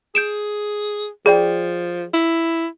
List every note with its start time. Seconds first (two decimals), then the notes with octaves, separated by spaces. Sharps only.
0.15 G#4 G6 D7 E7
1.26 F3 G#4 D5 G5
2.14 E4